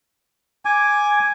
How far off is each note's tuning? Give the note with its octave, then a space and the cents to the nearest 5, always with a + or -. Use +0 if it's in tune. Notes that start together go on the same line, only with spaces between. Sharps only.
G#5 +0 D6 +0